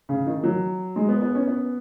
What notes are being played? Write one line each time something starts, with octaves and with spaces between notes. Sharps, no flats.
C#3
D#3
F#3
G#3
B3
B3
C#4
B3